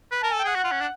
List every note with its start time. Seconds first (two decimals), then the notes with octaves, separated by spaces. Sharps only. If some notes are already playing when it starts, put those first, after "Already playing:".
0.11 B4
0.23 A#4 A5
0.31 A4 G#5
0.39 G5
0.44 G#4
0.47 F#5
0.55 F#4
0.64 F4
0.71 C#4
0.80 D4